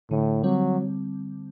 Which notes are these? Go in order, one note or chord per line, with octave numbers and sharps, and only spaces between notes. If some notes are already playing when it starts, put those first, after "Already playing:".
A2 D3
F#3 G3 C4